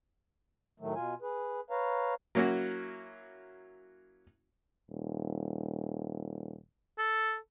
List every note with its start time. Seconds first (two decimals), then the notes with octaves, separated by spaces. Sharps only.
0.80 A2 D#3 F#3 A3
0.95 B2 F4 G#5
1.22 G#4 B4
1.70 B4 C#5 F5 A#5
2.35 F#3 A#3 C#4 E4 F#4
4.89 D#1
6.98 A4